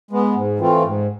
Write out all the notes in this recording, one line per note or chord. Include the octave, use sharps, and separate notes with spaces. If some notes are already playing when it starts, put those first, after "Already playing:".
G#3 B3
G#2
E3 A3 C4 F4
G#2